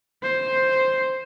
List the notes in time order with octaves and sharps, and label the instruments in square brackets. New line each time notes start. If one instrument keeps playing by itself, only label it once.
[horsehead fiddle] C5